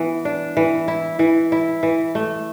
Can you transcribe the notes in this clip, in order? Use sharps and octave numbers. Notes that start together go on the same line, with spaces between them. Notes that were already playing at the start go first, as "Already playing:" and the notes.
Already playing: E3 B3
D4
E3
E4
E3
E4
E3
A3